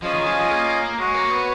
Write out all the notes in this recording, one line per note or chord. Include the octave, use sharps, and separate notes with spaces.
F3 C#4 F4 G#4 D#5 G#5
D#3
F3
G#3
A#3
G#3 F#4 C#5 F#5
A#3
B3